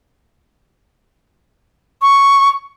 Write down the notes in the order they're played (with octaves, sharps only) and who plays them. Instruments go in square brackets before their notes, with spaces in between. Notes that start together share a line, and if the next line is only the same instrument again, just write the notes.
[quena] C#6